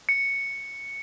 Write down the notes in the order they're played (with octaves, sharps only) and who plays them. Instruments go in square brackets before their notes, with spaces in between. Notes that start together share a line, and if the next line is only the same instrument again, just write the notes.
[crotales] C#7